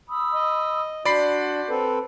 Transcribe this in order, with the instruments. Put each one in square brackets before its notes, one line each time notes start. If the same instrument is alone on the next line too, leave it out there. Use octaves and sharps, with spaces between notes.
[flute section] B5 D#6 E6
[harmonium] D#5
[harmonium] D4 [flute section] F#4 C6 G6 [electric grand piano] D5 B5 C7
[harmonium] C4 A4 B4